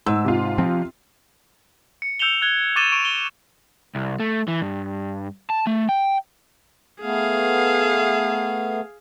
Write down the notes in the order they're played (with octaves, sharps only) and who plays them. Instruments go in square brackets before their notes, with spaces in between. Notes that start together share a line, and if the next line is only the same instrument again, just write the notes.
[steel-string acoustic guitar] G#2 [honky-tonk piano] E6
[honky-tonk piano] C3 F4
[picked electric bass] F3 C4
[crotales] C#7
E6 G6 C#7 E7 F7 G7
F#6 G#6 G7
C#6 D6 A6 D#7 E7 G7
C#6 D7
G7
[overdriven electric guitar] C2
A3
E3
G2
A5
A3
G5
[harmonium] A3 B3 [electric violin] G#4 F5